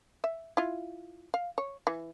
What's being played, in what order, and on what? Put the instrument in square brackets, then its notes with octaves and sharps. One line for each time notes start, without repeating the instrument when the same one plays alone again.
[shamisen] E5
E4 F4
F5
C#5
E3